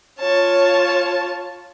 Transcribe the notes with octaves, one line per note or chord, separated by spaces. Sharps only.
F4 C#5 A5